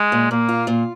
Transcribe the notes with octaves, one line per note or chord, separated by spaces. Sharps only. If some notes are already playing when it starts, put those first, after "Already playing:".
Already playing: G#3
A#2
A#2 A#3
F4
A#2